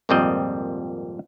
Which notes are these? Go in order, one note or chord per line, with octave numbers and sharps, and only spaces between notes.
G#1 F2 A#2 G3 C4 D#5